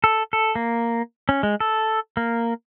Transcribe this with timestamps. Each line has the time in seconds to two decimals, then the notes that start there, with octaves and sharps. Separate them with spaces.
0.04 A4
0.33 A4
0.55 A#3
1.29 C#4
1.43 G#3
1.60 A4
2.17 A#3